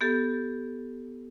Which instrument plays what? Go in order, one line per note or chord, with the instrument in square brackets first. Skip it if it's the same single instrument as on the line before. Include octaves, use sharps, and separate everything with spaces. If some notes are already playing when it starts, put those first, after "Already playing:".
[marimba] B3 G4 A4